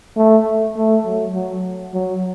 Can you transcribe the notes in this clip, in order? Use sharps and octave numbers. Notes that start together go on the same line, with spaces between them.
A3
A3
F#3
F#3
F#3